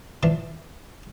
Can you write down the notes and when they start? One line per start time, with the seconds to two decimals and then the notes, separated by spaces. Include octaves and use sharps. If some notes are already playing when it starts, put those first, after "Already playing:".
0.23 E3 F3 D4